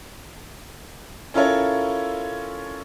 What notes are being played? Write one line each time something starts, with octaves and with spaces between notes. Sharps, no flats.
C#4 E4 F4 A4 A#4 C#5